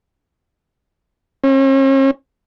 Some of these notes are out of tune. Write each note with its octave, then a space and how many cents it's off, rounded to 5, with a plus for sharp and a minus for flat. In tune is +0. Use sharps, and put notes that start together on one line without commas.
C#4 -45